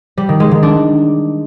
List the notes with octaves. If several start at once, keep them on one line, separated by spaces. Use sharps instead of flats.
G3
D#3
G#3
D#3
D4